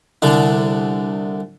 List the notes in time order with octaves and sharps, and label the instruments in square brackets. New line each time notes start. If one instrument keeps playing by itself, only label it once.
[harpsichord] C2 D3